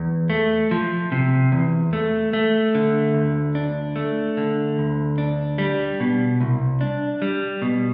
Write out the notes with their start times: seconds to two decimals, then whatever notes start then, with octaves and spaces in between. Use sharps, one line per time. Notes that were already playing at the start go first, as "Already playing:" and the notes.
Already playing: E2
0.30 A3
0.71 F3
1.12 C3
1.52 E2
1.93 A3
2.33 A3
2.75 D3
3.14 D2
3.55 D4
3.96 A3
4.37 D3
4.78 D2
5.18 D4
5.58 G3
6.00 B2
6.40 C2
6.81 D4
7.22 G3
7.62 B2